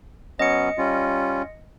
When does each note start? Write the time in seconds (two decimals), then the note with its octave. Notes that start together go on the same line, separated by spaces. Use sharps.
0.39 F#3 B3 C#4 D#5 C#7
0.78 G3 C#4 F4